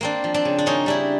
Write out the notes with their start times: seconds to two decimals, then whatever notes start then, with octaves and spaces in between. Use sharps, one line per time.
0.01 A#3 C4 D4
0.24 F3
0.34 C4 D4
0.45 C#3
0.59 D4
0.66 A#3 C#4 D#4
0.86 G3 D4 E4